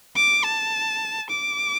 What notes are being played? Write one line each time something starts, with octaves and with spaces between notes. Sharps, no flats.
D6
A5
D6